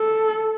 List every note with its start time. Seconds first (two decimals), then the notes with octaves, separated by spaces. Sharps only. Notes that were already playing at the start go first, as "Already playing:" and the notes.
Already playing: A4